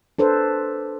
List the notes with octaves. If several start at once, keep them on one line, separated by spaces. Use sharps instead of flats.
D4 A4 B4 C5